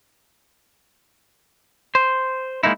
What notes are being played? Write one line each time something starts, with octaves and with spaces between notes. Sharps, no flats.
C5
G#3 A#3 D#4 E4